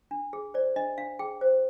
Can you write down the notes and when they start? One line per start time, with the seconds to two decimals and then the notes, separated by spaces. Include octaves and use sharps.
0.11 D4
0.33 G#4
0.54 C5 D5
0.76 D4 D#5
0.98 D4 F5
1.19 G#4 G5
1.41 C5